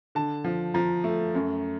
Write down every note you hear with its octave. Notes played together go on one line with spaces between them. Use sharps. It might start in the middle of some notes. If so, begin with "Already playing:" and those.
D3 A5
F3
F3 A#5
A3
F#2